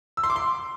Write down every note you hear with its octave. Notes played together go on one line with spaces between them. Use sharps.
E6
C6
D6
C6